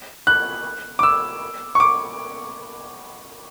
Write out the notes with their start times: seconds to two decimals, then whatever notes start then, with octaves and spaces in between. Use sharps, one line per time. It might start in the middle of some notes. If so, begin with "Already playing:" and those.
0.27 F#6
0.99 D6
1.03 E6
1.75 C#6
1.80 D6